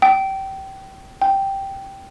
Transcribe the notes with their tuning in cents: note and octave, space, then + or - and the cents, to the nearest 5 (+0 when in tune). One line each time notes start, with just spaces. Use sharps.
G5 -20
G5 -5